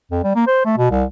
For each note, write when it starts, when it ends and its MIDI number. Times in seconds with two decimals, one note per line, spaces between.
0.11 0.21 41
0.24 0.31 55
0.35 0.45 58
0.47 0.63 72
0.65 0.74 57
0.77 0.89 47
0.90 1.04 36